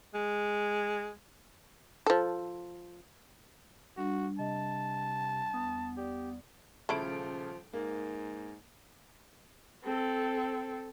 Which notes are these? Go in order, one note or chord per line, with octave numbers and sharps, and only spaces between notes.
G#3
F3 A4
G3 D4 F#4
C3 D#5 A5
E2 B3 D#6
G4 D5
D#1 C#3 F3 A3 E4 D7
G#2 A#3
C4 A4